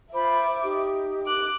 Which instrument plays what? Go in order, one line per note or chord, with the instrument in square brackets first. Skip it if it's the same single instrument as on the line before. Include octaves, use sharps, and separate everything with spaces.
[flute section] F4 C5 B5 [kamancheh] E5 D6
[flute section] D#4 G4
[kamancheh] D6 F#6